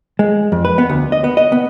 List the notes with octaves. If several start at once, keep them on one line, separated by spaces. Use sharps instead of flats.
G#3
F2
B4
B3
D2
D#5
B3
D#5
B3